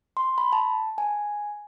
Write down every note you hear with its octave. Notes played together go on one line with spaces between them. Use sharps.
C6
B5
A5
G#5